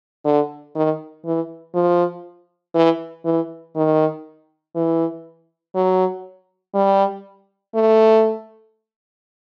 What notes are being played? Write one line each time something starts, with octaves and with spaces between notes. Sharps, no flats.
D3
D#3
E3
F3
E3
E3
D#3
E3
F#3
G3
A3